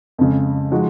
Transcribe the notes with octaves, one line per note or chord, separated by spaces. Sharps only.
F2 C#3 G#3
F3 G#3 D#4 F#4